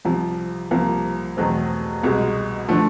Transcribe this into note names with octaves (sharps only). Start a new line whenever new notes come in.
C2 C3 F3
C2 C3 F3 A#3
E2 B2 F#3 A3 C4
C2 B2 G#3
D3 F3 A3